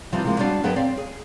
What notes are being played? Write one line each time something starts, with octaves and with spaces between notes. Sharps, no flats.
C3 E3 F3 G3 D#4
C3 F3 G#3 A#3
G3 B3 D4 F#4 D5 F5
F#2 F#3 B3 G#4 B4 G5
C4 C#5 D5 F5
G#4